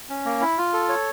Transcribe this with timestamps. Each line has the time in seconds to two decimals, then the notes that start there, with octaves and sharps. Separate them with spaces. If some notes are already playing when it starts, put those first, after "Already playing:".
0.10 C#4
0.25 A#3
0.41 E4
0.58 F4
0.73 A4
0.89 C#5